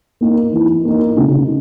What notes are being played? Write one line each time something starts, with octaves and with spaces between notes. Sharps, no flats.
A#3 D#4
E3
A#3 D#4
C#3